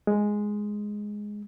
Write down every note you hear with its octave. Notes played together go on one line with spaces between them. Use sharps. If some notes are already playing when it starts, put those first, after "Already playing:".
G#3